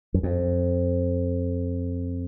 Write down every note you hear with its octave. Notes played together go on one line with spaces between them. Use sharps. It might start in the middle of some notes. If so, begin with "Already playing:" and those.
F#2
F2